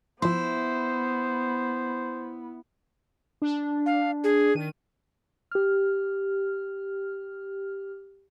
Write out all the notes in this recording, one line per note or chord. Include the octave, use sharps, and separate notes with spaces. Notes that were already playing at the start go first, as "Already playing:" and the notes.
F3 B3 E4 C5 B5 C6
D4
F5
G#4
D#3 D#7
G4 F6